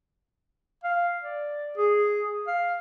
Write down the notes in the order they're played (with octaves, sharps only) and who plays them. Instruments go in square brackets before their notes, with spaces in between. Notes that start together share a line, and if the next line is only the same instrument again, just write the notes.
[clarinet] F5
D5
G#4
F5